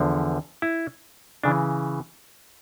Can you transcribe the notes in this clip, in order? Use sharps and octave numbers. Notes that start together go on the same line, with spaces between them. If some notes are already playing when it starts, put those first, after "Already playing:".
Already playing: E2 D3 F3
E4
C#3 E3 D4